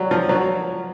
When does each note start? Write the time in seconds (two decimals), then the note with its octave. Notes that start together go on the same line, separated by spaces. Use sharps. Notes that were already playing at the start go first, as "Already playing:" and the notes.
Already playing: F#3 G3
0.11 F3
0.29 F#3